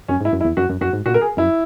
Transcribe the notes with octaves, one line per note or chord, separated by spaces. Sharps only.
F#2 C#4
G#2
E4
F#2
E4
E2
F#2 F#4
F#2
F#2 F#4
G#2
A#2 F#4
A#4
G#4
F#2 E4